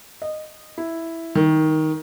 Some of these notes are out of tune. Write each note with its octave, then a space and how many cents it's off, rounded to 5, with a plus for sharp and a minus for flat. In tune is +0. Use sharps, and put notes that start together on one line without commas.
D#5 -15
E4 +0
D#3 +10